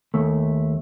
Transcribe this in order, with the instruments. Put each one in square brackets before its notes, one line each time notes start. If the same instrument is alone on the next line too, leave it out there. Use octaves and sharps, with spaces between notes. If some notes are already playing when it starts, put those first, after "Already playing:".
[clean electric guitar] D#2 A3